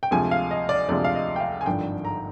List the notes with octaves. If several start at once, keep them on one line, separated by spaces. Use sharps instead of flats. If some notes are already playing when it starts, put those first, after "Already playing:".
G5
D2 C3 F3 G#3 G#5
F5
D#5
D5
D2 C3 F3 G#3 D5
F5
D#5
G5
F5
G#5
G#1 G2 D3 F3 G5
A#5